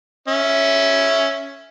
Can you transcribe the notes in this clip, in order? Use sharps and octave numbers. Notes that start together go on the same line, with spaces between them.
C#4 E5